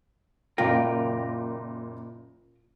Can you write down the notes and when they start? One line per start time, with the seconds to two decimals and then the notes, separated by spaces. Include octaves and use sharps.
0.58 F#1 A#2 F4 A#4 G5